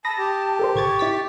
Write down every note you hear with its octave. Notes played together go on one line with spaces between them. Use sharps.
A5 B5 D#6 A#6
G4
A4 A#4 C5
A1 C#6 G#6 A6
E4 A6 B6